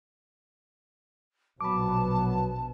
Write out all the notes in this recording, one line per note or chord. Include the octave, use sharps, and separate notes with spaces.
A#1 B2 F#3 B3 A5 B5 D6